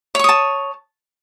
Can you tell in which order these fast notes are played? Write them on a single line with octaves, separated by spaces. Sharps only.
C#5 C#6 D#6 A5